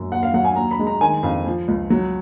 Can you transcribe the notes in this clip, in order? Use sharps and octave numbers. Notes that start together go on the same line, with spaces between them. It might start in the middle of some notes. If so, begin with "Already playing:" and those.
Already playing: F#2
D#2 F#5
F5
F#3 F#5
G#5
D#2 A#5
B5
G#3
A#5
D#3 G#5
F2 F5
F3
C#2
F#3